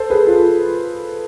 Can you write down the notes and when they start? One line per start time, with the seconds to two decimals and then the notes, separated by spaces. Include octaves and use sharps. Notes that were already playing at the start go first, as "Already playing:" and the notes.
Already playing: A4 C5
0.10 G#4 B4
0.26 F4 A4